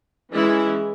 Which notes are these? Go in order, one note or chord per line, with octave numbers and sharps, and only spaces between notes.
E3 G#3 C#4 E4